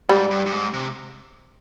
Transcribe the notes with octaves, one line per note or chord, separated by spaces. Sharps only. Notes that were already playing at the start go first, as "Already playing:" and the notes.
G#2 G3
G2
G2
G#2
C3